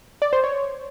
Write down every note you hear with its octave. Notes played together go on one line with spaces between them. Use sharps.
D5
C5
C#5